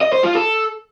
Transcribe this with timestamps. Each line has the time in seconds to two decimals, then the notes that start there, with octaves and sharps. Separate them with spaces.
0.01 D#5
0.13 C5
0.24 F4
0.35 A4